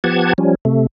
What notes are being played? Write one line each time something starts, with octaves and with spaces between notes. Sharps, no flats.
F3 B3 G4 F#5 A5 G#6
F3 G3 C#4
C3 A3